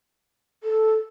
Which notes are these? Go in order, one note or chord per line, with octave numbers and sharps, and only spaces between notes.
A4